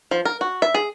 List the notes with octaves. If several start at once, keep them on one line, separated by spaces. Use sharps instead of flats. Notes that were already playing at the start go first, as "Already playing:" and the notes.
F3
A#4
F#4
E5
G#4